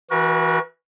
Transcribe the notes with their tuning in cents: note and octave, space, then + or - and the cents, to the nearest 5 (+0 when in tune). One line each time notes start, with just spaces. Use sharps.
E3 +0 F#4 +0 A#4 +45